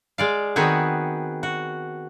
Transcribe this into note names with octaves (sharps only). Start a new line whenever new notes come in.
G#3 D5 F5
D#3 B3 C4 F#4 G#4
F#4